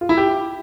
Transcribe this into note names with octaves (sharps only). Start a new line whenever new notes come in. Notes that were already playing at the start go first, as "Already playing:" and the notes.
F4
E4
G4